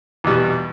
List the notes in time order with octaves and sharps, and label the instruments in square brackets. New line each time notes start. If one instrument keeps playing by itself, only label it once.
[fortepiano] E2 B2 G3